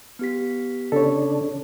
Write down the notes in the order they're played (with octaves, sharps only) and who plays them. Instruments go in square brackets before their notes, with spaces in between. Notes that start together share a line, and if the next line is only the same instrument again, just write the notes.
[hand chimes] B3 G4 B6
[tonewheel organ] C#3 D4 [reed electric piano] A4 C#5